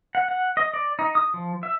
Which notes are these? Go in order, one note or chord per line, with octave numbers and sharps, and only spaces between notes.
F#5
F#5
D#5
D5
D#4
D#6
F3
E5